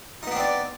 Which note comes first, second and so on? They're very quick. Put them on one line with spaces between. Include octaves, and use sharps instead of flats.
D#4 B3 D4 C4 D5